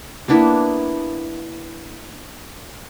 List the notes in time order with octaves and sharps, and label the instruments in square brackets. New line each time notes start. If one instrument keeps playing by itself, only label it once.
[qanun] A#3 B3 D4 E4